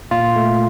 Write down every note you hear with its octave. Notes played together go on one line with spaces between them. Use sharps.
A#2 F4
A3